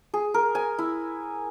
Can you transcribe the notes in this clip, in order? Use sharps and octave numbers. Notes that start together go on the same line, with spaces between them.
G#4
A#4
G#5
E4